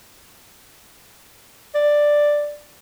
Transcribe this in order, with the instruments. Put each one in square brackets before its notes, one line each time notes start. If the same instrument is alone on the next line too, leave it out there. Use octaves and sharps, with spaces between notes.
[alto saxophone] D5